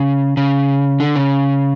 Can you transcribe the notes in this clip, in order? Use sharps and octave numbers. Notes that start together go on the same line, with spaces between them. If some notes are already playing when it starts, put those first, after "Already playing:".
Already playing: C#3
C#3
D3
C#3